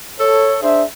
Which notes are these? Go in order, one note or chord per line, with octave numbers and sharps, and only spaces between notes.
A4 C#5
D4 G#4 C5 E5